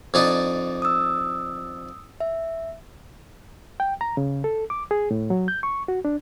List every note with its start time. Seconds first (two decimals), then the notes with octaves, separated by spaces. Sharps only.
0.14 F2 D4 D#4
0.82 D#6 E6
2.20 E5
3.80 G5
4.01 A#5
4.17 C#3
4.44 A4
4.70 D6
4.91 G#4
5.11 A2
5.30 F#3
5.48 G6
5.63 C#6
5.88 F#4
6.05 D4